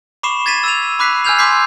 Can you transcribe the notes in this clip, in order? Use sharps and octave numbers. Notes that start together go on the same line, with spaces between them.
B5 C#6 D6 C7 E7
G#6 A6 B6 D#7 E7
E6 D#7 F7
B5 D6 F#6 B6 C7
G#5 E6 F6 G6 G#6 F7
C6 D6 G6 B6 C7